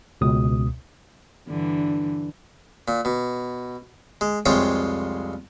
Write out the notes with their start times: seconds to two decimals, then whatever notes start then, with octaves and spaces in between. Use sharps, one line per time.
0.21 C#2 B2 D#6
1.49 G2 D3 E3
2.88 A#2
3.05 B2
4.21 G#3
4.46 C2 F2 G#3 F4 C#5 G5